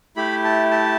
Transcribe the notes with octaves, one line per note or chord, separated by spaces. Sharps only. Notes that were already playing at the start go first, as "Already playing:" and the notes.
A3 E4 G4 B5
A5
A5